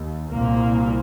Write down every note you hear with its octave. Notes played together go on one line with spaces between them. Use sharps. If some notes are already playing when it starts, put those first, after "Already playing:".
Already playing: D#2
C2 A#2 A#3